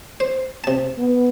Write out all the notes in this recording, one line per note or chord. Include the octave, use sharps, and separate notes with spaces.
C5
C3 A5
B3